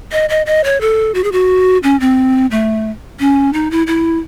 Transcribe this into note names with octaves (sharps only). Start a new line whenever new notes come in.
D#5
D#5
D#5
C#5
A4
F#4
G#4
F#4
C#4
C4
A3
C#4
D#4
E4
E4